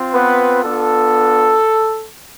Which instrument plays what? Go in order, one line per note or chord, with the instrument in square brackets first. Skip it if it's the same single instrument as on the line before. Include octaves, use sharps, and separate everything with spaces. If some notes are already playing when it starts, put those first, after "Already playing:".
Already playing: [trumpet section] C4 F4
B3 B4
B3 D4 F4 A4